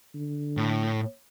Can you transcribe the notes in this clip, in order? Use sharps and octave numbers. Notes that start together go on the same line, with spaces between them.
D3
A2